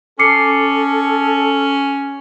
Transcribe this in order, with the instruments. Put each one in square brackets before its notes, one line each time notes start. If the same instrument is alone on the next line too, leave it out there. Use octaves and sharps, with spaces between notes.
[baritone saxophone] C#4 [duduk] A4 [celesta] D6 C7 C#7